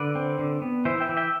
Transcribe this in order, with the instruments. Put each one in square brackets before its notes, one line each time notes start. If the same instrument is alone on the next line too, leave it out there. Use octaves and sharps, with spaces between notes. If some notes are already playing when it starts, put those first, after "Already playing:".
Already playing: [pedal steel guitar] D3 B4 D5
C4
D3
B3
E3 C5 E5
E5 G5
E3
E5 G5